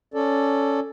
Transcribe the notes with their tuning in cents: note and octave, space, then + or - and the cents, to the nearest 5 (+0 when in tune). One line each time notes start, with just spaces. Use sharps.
C#4 +0 A4 +0 D5 +0